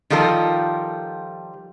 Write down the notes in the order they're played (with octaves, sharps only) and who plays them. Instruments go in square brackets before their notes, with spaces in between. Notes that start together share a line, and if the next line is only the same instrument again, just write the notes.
[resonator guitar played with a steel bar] D#3 F3 G3 F4 A4 A#4